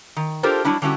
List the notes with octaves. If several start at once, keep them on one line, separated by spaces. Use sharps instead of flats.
D#3
D4 F4 G4 A4 A#4 C5
F#3 G3 D4 E4
D3 G3 C#4 E4 F#4